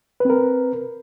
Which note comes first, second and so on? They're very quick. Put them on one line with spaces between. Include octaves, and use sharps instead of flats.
B4 C4 A#4